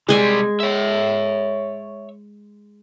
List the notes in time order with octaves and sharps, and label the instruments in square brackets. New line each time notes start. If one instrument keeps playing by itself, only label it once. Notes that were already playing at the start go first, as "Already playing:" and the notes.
[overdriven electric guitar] C3 G3 [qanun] G#3 G#5
[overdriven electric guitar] C#5 E5